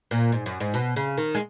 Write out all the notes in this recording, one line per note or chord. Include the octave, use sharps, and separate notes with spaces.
A#2
G#2
F#2
G#2
B2
C#3
D#3
G#3